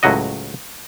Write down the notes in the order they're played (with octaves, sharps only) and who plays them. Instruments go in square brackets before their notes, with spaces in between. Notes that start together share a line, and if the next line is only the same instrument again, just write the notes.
[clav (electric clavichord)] C#2 A2 F#3 F#4 D#5